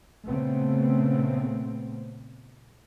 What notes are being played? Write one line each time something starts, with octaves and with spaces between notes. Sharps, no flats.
A#2 C#3 A3 B3 C4